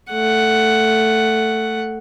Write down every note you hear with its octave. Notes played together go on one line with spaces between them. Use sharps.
A3 F#5